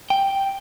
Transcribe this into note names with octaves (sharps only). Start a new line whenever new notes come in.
G5